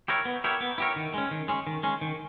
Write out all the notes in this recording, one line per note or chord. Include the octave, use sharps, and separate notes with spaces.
E4 G4 A#4 C#5
B3
E4 G4 A#4 C#5
B3
E4 G4 A#4 C#5
D#3
G#3 C#4
D#3
G#3 C#4
D#3
G#3 C#4
D#3